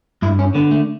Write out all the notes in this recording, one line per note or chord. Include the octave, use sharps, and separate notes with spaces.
G2 E4
C#4
D3 B3
A3